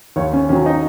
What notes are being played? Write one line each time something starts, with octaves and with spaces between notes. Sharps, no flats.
D#2 C#5
C#4
D#3 F#3 C#4
D#4